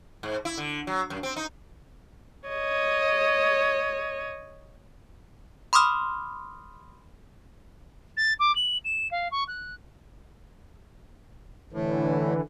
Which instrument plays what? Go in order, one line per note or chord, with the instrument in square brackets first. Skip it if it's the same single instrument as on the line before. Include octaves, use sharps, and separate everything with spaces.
[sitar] G#2
E4
D3
F#3
F#2
C4
D#4
[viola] C#5 D#5
[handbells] B5 C6 D6 D#6 F6
[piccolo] A6
D6
F#7
E7
F5
C#6
F#6
[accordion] A2 [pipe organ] D3 E3